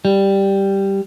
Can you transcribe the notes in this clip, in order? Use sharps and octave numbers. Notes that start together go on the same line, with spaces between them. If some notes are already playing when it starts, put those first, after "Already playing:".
G3